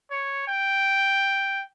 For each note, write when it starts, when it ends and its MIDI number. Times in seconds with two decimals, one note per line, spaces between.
0.11 0.45 73
0.48 1.64 79